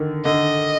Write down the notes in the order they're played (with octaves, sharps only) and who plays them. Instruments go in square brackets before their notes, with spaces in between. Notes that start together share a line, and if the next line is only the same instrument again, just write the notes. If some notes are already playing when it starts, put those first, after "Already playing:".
Already playing: [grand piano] D3 D#3
[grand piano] D3 [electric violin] D#5